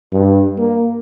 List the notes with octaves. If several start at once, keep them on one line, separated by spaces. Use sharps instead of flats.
G2
A#3